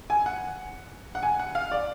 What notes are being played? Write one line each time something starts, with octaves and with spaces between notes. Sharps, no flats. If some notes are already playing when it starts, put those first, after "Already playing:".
G#5
F#5
F#5
G#5
F#5
F5
D5